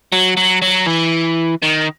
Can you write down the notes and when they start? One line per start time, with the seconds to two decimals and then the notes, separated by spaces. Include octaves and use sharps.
0.12 F#3
0.37 F#3
0.62 F#3
0.87 E3
1.62 D#3